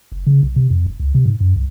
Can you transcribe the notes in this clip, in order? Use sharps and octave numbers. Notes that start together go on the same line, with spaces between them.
F#1
C#3
B1
C3
F2
E1
C#2
C3
G#2
F#2
C2